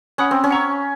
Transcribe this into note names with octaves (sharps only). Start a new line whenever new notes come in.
C#4 F#5 B5 D#6 F#6
C4
C#4
F#5 A#5 C#6 E6